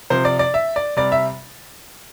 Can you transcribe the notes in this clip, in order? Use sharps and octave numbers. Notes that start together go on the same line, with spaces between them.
C3 F3 C5
D5
D5
E5
D5
C3 G3 D5
E5